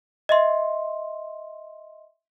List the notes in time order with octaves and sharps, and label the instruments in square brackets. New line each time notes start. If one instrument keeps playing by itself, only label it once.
[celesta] D#5 E5 C6